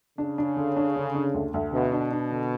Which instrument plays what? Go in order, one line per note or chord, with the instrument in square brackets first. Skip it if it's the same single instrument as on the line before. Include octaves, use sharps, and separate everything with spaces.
[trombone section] C#3 [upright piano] D4
[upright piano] D4
D3
D4
D3
D4
D2
D2
[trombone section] B2 [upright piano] D3
[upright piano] D4
D4
D3